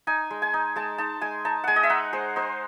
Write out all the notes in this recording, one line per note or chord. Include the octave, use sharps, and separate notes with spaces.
D#4 G#5
G#3
G#5
D#4
G#3 A5
D#4 A5
G#3 G#5
D#4 A5
G#3 F#5 G#5
D#5
E5
D#4 F#5
G#3 C5
D#4 C5